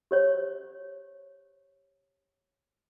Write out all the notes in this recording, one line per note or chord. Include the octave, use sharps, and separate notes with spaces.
G4 C5 C#5